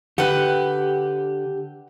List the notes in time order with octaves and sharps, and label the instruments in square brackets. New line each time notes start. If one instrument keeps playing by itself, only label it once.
[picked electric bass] D3 [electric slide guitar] G4 [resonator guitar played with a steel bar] B4 F#5